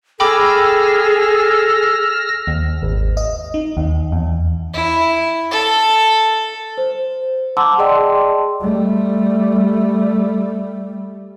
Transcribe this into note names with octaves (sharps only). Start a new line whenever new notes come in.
G#4 A4 G5 B5 D6 E6 F6 A#6
D#2
G#1
D#5
D#4
D#2
E2
E4
A4
C5
F#5 A5 A#5 C6 D6 E6
G#4 D5 D#5 G5 A5 C6
G3 A3